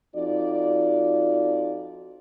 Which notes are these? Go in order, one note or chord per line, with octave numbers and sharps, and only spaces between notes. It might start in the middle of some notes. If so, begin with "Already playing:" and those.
F2 D#4 F4 F#4 D5